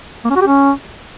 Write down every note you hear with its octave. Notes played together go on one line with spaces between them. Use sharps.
A#3
C#4
F#4
G4
C#4